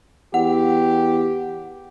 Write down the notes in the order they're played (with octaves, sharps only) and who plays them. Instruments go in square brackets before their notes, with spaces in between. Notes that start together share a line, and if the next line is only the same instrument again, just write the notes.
[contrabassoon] E2 [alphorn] G4 [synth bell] F#5